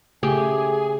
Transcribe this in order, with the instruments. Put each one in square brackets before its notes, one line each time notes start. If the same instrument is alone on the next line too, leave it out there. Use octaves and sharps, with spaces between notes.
[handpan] C#3 A3 [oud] G4 [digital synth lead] G#4 [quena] G#5